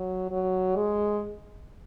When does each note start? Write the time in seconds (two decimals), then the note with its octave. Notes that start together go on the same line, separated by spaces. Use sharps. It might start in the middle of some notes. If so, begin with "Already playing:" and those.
Already playing: F#3
0.31 F#3
0.76 G#3